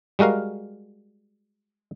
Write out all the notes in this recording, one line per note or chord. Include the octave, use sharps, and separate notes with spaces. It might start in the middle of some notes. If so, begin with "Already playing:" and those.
G3 G#3 F#4 A#4 F5